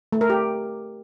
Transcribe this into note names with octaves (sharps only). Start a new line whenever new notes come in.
A3
A#4
G4